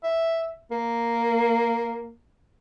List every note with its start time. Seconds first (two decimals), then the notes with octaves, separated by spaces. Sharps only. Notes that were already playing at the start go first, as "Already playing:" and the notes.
0.04 E5
0.71 A#3